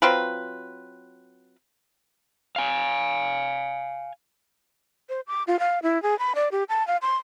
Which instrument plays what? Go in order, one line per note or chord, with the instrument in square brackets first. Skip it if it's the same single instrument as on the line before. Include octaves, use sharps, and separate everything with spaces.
[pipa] F#3 C4 F4 B4
[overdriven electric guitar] F5 G#5
[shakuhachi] C5
D6
F4
F5
E4
G#4
B5
D5
G4
A5
F5
C6